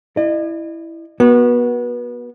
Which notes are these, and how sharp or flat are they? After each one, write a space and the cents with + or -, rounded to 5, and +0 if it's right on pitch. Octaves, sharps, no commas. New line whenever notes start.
E4 +0 D#5 -45
B3 -30 F#4 +0